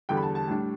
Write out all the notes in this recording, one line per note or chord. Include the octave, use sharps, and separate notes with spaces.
E2 D3 G3 G5
B5
A5
A5
A2 G3 D4